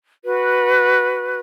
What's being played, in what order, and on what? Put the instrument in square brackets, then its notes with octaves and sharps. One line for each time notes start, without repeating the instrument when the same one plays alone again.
[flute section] F#4 B4